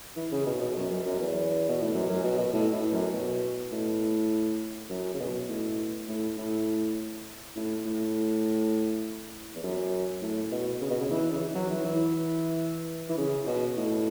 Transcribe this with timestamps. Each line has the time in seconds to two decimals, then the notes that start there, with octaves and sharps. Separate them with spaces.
0.16 E3
0.32 C#3
0.46 B2
0.61 B2
0.76 F#2
0.90 F#2
1.06 F#2
1.20 E2
1.69 B2
1.82 A2
1.94 F#2
2.09 F#2
2.24 B2
2.38 B2
2.53 A2
2.73 A2
2.93 F#2
3.13 B2
3.71 A2
4.90 F#2
5.14 C#3
5.20 B2
5.49 A2
6.08 A2
6.38 A2
7.56 A2
7.85 A2
9.55 E2
9.63 F#2
10.22 A2
10.52 B2
10.81 C#3
10.90 B2
11.01 C#3
11.11 E3
11.31 C#3
11.40 E3
11.55 F#3
11.70 E3
11.84 E3
13.09 E3
13.17 C#3
13.47 B2
13.77 A2